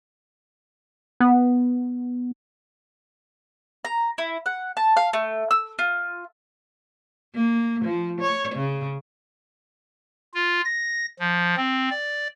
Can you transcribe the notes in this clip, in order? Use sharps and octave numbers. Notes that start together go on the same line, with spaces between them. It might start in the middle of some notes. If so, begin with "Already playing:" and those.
B3
A#5
E4
F#5
A5
F5
A3
E6
F4
A#3
F3
C#5
C#3
F4
A#6
F3
C4
D5